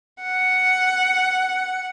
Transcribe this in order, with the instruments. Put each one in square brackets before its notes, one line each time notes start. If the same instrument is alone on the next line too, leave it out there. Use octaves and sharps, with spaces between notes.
[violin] F#5